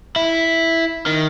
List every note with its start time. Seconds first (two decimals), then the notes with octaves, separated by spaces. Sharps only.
0.16 E4
1.06 D#3